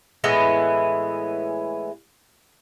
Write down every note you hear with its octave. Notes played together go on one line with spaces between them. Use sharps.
A2 E3 G#3 B3